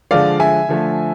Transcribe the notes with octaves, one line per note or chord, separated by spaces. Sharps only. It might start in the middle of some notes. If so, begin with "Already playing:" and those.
D3 F3 G#3 D5 F5
E5 G#5
D3 F3 A3